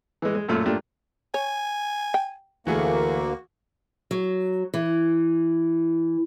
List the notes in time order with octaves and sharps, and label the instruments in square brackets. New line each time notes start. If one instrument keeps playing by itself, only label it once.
[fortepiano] E3 G#3
G#3
F#2 A#2 A3 F4 E6
A3 A#3 D4 F4 G4
[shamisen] C#5 [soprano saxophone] G#5
[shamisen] G5
[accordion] D2 A#3 [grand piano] E3 A3 G#4 [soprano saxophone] F#4
[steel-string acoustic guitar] F#3
E3